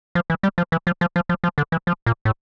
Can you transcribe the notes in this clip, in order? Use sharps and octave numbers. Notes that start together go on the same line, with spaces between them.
F3
E3
G3
F3
E3
F3
F3
F3
F3
F3
D3
E3
F3
A#2
A2